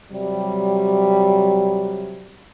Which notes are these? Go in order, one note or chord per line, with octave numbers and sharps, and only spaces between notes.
C3 F#3 G3